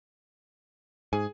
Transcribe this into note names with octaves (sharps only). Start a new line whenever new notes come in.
G#2 G#4 G#5